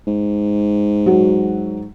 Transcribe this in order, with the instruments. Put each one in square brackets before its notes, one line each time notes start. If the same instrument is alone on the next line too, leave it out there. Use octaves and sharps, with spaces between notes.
[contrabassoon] G#2
[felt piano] F#3 F#4